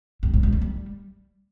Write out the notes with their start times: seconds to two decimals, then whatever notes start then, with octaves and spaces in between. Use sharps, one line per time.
0.23 G2
0.34 A2
0.43 G3
0.53 A3
0.62 G3